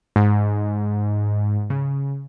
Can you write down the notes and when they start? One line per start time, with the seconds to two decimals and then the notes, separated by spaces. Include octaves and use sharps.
0.16 G#2
1.70 C#3